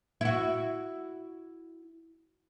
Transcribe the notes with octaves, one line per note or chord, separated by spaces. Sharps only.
E4 F#4